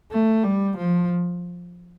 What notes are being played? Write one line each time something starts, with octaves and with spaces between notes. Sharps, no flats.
A3
G3
F3